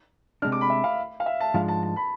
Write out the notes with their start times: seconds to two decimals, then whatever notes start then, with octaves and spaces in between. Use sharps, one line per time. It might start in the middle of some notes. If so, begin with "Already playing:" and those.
0.42 C3 G#3 D4 F6
0.52 D6
0.61 B5
0.70 E5
0.84 F5
1.20 F5
1.26 E5
1.40 A5
1.54 G#2 F3 G#3 D4 F5
1.68 A5
1.83 A5
1.96 B5